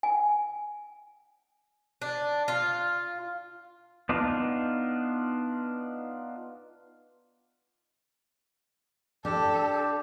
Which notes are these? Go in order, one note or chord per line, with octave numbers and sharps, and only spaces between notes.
G#5
D4
F4
B3 D4 D#4 F4
D4 G4 A4